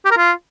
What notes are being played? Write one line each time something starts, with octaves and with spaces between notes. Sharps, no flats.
G4
A#4
F4